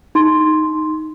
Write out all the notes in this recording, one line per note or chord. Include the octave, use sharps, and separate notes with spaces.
D#4 C6